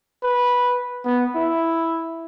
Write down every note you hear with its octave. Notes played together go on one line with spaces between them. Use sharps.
B4
B3
E4